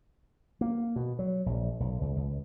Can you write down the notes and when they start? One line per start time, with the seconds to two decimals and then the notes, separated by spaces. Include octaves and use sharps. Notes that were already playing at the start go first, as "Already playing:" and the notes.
0.61 A#3
0.96 B2
1.19 F#3
1.46 A#1
1.80 B1
2.01 C#2
2.16 C#2